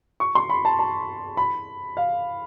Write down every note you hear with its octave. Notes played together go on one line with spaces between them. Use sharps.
C#6
C6
B5
A5
A5
B5
F5